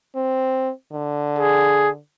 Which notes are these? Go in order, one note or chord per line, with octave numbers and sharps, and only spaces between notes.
C4
D3
G#4